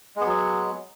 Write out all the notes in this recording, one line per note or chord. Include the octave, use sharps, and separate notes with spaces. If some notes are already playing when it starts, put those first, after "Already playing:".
F#3 G#3 B3